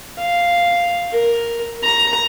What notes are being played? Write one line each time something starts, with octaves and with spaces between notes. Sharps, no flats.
F5
A#4
A#5